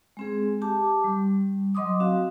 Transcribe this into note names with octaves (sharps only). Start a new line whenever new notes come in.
G#3 C4 G#4
G4 A5 D6
G3
F#3 D#5 C6 D6 D#6
C4 F#4 F5